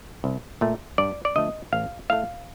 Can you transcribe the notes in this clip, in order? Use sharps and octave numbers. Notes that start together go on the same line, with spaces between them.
C2
A#2 A3
G2 D5
D5
D3 F3 A3 D#5
A1 F5
A2 A3 F5